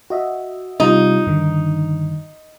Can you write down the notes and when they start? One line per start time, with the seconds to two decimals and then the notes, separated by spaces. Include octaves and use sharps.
0.10 F#4 D#5 E5
0.80 C3 G3 D#4 F4
1.26 G2 D3 D#3